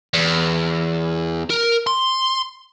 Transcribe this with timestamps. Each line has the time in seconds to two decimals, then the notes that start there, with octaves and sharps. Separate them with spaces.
0.14 E2
1.50 A#4
1.87 C6